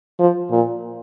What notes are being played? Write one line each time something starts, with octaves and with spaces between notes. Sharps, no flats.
F3
A#2